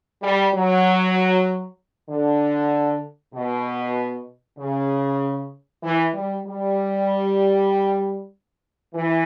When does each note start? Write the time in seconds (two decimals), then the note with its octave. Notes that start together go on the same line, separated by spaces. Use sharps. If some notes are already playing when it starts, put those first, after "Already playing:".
0.23 G3
0.54 F#3
2.10 D3
3.34 B2
4.59 C#3
5.83 E3
6.14 G3
6.46 G3
8.94 E3